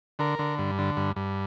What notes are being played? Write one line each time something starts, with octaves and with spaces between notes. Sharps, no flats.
D3 A#4
D3
G2
D3
G2
G2